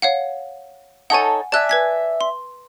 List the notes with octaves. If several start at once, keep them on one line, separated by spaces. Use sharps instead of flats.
C#5 F5 F#5
D#4 A4 C#5 F#5 G#5
D5 E5 G#5 A5 F#6
B4 G#6 B6
C6